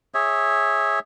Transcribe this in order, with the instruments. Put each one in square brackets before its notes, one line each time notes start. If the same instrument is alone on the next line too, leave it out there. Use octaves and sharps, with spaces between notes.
[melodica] G#4 C#5 E5